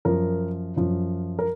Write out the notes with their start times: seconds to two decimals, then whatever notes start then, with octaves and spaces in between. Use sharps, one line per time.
0.05 F#2 F3 A#4
0.76 F#2 F3
1.39 A#4